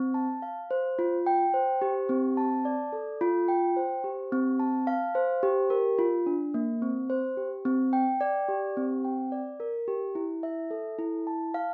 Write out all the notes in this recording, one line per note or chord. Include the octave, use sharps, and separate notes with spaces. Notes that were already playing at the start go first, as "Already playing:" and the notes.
Already playing: C4
A5
F5
C5
F4
G5
C5
G4
C4
A5
D5
A4
F4
G5
C5
G4
C4
A5
F5
C5
G4
A#4
F4
D4
A#3
C4
C5
G4
C4
G5
D5
G4
C4
G5
D5
A#4
G4
E4
E5
A4
E4
A5
F5